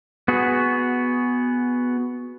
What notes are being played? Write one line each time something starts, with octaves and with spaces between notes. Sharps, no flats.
B3 F#4 G#4